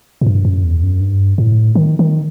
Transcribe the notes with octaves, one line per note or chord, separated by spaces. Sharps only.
A2
G2
F#2
E2
F#2
G2
A2
D#3
D#3